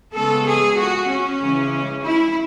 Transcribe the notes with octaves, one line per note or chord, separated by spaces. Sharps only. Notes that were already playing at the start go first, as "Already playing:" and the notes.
C#3 G#3 B3 A4
G#4
F#4
C#4
C#3 E3 G#3
E4